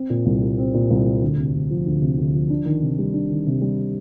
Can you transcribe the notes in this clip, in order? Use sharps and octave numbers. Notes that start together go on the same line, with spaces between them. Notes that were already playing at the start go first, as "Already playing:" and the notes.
Already playing: C4
A#2
C2
G3
C4
A#2
C2
G3
D2
C3
D2
F3
D2
C3
D2
F3
D4
D#3
C3
G3
D4
D#3
C3
G3